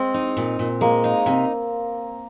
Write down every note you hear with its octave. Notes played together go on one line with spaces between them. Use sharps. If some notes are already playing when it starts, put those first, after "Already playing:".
Already playing: G#3 C4
D#4
A#2
A#2
G#3 A#3
D#4
C3